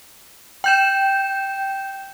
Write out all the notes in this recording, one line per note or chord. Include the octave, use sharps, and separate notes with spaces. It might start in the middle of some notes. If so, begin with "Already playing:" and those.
G5 G6 E7